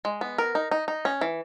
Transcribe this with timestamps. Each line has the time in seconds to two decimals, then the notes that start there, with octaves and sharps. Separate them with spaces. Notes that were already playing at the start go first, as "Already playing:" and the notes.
0.05 G#3
0.21 B3
0.38 A#4
0.55 D#4
0.71 D#4
0.88 D#4
1.05 C#4
1.21 E3